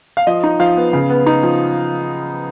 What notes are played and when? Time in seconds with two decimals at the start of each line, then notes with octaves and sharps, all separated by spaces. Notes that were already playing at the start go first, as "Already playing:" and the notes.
0.17 F5
0.27 F3 D#5
0.43 D#4
0.60 F3 F5
0.76 B3
0.93 C#3
1.10 B3
1.26 D#4
1.43 F3